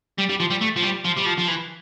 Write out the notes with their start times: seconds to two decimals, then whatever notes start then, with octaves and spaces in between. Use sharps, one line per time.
0.18 G3
0.29 G3
0.40 F3
0.50 G3
0.61 A3
0.76 F3
0.83 G3
1.04 F3
1.17 G3
1.26 F3
1.38 F3
1.48 E3